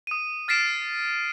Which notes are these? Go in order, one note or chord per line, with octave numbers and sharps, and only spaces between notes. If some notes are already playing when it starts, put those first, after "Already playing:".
D#6 D#7
F6 A6 B6 C7 D7 E7